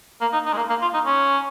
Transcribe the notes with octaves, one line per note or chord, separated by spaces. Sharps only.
A#3
D#4
D#4
G#3
A#3
A#3
F4
D#4
C#4